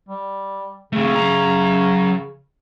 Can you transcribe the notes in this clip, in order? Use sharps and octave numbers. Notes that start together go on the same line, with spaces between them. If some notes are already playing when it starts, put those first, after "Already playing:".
G3
C#3 A3 C4
F#2 A#5